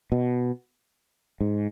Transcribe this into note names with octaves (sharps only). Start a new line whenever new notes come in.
B2
G#2